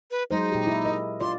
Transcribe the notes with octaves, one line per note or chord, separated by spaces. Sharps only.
B4
F#3 G#3 D#4 C5
A#2 G4
E4
A#4 D#5
F4 D5 C6